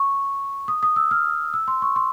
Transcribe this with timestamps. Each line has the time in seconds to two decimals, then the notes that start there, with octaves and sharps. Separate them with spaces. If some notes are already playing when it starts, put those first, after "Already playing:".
Already playing: C#6
0.68 D#6
0.83 D#6
0.96 E6
1.11 F6
1.54 E6
1.68 C6
1.82 C#6
1.96 C6